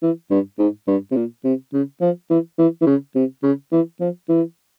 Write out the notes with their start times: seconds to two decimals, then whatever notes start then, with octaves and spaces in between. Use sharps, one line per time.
0.02 E3
0.30 G2
0.59 G#2
0.87 G2
1.11 C3
1.16 A#2
1.44 C3
1.73 C#3
2.01 F3
2.30 E3
2.58 E3
2.81 E3
2.86 C#3
3.15 C3
3.43 C#3
3.72 E3
4.00 F3
4.29 E3